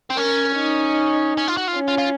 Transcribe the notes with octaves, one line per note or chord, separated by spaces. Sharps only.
C4
C#4 A#4
D#4
C#4
F4
F#4
F4
C#4
F4
F4